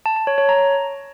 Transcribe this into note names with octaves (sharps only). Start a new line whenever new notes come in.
A5
A5
C#5
C#5
A#5